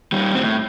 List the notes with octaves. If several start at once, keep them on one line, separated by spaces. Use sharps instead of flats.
D#3 G3
A2 C4